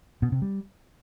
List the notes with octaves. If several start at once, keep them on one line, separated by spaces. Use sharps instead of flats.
B2
C3
G3